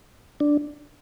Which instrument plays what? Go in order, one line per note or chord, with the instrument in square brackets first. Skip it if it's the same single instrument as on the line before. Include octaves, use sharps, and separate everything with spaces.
[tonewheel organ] D4